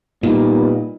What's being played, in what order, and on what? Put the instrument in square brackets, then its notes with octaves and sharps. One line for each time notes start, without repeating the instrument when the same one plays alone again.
[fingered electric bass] A#2 [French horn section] G3 B3 D#4